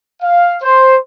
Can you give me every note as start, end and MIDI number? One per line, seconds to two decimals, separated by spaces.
0.22 0.56 77
0.63 0.97 72